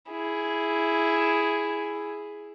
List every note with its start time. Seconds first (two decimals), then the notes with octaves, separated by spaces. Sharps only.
0.11 E4 G#4